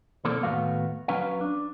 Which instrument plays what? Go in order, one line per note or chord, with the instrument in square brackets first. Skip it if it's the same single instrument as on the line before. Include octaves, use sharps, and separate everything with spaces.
[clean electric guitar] B1 E3 A#3 C4 A4 D5
D#2 A2 A3 B3 F#4 F5
F#3 C#4 B4 F5
D4